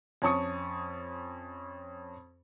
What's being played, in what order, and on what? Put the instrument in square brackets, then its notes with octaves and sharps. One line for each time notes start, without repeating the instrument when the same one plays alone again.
[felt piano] F2 C#4 A5 C#6 D#6 C#7